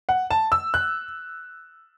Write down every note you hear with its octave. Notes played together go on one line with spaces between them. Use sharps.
F#5
A5
E6
F#6